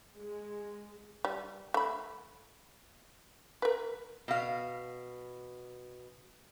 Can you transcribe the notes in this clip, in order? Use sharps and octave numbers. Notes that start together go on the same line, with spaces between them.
G#3
G3
A3 B5
A#4 B4
B2 F5